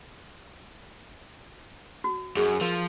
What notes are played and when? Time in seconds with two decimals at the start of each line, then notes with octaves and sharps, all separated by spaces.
2.04 F#4
2.36 F#2 G4 G#4
2.61 F3 A#4